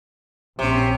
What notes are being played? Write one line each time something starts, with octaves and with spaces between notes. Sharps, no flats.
A#1 C3 C4 C#4